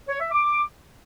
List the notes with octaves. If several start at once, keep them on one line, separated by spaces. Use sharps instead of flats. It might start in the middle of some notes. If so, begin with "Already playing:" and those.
C#5
E5
D6